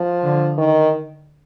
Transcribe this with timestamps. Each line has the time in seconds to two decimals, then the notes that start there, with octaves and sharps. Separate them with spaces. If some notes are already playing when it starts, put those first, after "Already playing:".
Already playing: F3
0.23 D3
0.58 D#3